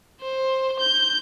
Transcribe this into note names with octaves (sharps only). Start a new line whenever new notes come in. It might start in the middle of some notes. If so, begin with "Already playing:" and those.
C5
G6